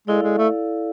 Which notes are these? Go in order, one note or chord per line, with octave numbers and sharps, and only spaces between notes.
G#3 E4 A4 D5 F5
G#3
A3